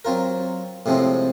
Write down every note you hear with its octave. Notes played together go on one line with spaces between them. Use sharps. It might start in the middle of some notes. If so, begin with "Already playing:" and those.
F#3 C4 F4 A#4
A2 C3 F3 G#3 C4